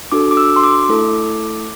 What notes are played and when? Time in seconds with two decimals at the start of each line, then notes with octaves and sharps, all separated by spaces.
0.12 D4 F#4 A4 D6
0.31 D6
0.37 E6
0.56 C6
0.63 D6
0.89 A3 E4 A4